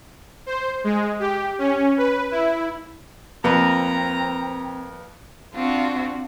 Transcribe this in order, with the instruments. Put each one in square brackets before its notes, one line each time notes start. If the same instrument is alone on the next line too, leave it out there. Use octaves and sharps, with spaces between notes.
[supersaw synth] C5
G#3
G4
C#4
B4
E4
[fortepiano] F2 [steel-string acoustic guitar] A#3 B4 [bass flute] C4 [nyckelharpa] A#5
[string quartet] C4 D4 F4 F#4